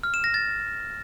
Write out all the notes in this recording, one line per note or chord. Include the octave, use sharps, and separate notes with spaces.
F6
E7
A#6
A6